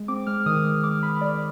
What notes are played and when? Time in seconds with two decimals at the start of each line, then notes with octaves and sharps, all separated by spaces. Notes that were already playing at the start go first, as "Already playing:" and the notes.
Already playing: G#3
0.08 C4 D6
0.27 G#3 F6
0.46 D#3 D#6
0.64 G#3 D#6
0.83 G#3 D6
1.03 G#3 B5
1.21 G#3 D5